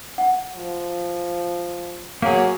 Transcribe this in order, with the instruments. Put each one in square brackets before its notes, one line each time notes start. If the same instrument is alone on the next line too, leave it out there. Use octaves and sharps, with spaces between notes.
[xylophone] F#5
[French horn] F3
[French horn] F#3 [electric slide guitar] A#3 G#4 [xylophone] F5